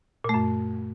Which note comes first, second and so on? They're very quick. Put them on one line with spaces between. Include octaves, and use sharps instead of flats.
A#2 A3 F#2